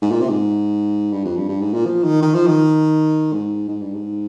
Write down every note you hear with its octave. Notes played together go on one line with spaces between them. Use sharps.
G#2
A#2
C3
G#2
G2
F2
G2
G2
G#2
A#2
F3
D#3
D#3
F3
D#3
G#2
G#2
G2
G#2